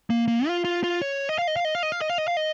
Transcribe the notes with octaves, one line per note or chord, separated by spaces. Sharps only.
A#3
A#3
F4
F4
F4
C#5
D#5
F5
D#5
F5
D#5
F5
D#5
F5
D#5
F5
D#5
F5
D#5